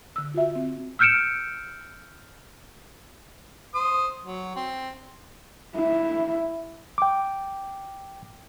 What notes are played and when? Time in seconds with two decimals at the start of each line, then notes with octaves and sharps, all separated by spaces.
0.16 D3 E6
0.34 F4 F#4 E5
0.55 C4
0.99 E6 F6 G6 C#7 D7 E7
3.75 C5 D#6
4.25 F#3
4.56 C4
5.76 E4
6.98 G5 D6